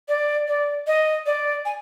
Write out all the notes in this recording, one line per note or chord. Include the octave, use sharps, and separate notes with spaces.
D5
D5
D#5
D5
G#5